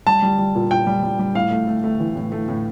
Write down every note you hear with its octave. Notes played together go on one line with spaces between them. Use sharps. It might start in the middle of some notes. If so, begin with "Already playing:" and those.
G3 A5
G3
G3
A#2
A#2 G5
G3
G3
G3
A2 F5
A3
A3
A3
E3
A2
A3
A2